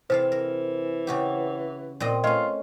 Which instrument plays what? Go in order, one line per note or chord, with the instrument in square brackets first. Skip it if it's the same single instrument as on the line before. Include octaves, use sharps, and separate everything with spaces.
[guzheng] C3 A4 F5 [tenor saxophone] E3 [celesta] C5
[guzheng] A#4
C#3 F#4 G4
A#2 C4 D#5
[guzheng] A3 C#4 [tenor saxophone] F4 [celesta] D#5